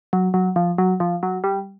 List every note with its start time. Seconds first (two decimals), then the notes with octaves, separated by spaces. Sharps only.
0.13 F#3
0.34 F#3
0.56 F3
0.78 F#3
1.00 F3
1.23 F#3
1.44 G3